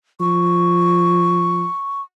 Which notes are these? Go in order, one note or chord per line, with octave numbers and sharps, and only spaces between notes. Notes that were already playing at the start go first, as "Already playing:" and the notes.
F3 C#6